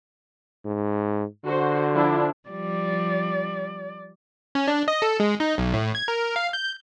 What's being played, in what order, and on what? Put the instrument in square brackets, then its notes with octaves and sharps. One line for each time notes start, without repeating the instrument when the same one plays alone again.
[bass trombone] G#2
[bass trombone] D3 [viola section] F#4 C5
[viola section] F3 D4 E4
[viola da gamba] F3 G3 [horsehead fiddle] D5
[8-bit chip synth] C#4
D4
D#5
A4
G#3
D#4
B1
A2
G#6
A#4
F5
G6